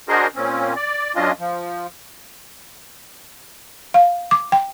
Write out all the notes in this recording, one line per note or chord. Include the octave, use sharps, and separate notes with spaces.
D4 F#4 G#4 A#4 C5 D#5
A#2 C4 C#4
D5
F#2 C#4 D4 F4 D#5
F3
F5
D6
G5